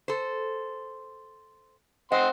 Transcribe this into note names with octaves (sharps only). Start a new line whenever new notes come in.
A4 C5
C4 D#5 F#5 C6